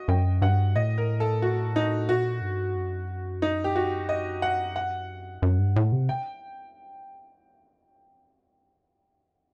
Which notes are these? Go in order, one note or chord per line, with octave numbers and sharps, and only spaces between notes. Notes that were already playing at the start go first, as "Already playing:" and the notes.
Already playing: F#4 D#5
F#2 G5
G2 F#5
A2 D#5
A#4
A4
F#4
D#4
A#2 F#4
G2
F#2
D#4
G4
F#4
D#5
F#5
F#5
F#2
G2
A2
C3
G5